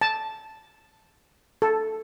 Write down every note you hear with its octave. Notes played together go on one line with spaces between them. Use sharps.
A5
A4